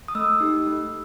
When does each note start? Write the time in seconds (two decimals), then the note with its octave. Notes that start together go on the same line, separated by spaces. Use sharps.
0.08 D#6
0.15 A3 E6
0.40 D#4 G4
0.67 A3